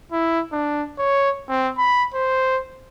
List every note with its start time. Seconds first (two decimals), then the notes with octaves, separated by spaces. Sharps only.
0.12 E4
0.53 D4
0.98 C#5
1.49 C4
1.78 B5
2.14 C5